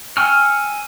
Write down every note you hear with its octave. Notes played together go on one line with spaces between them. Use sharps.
G5 G#5 C#6 E6 F6